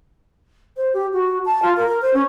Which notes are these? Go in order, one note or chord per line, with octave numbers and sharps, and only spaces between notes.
C5
G4
F#4
A5
F4
A#4
C5
C#4